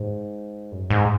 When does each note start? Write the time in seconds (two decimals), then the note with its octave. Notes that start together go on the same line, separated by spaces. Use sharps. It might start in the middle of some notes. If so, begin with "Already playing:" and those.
Already playing: G#2
0.72 F#2
0.90 G#2